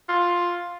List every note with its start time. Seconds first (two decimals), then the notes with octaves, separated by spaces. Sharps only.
0.09 F4